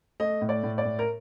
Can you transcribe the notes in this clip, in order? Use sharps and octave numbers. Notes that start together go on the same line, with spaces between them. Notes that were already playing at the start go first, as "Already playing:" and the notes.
A3 D#5
A2
D5
A2
D5
A2
A#4